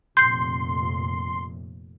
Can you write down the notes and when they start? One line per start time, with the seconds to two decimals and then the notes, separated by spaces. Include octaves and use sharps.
0.17 F1 F2 A#2 C6 G6 C7